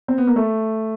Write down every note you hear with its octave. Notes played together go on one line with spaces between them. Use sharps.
C4
B3
A#3
A3